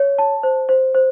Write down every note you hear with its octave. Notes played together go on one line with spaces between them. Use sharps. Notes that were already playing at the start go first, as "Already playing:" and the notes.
Already playing: C#5
A5
C5
C5
C5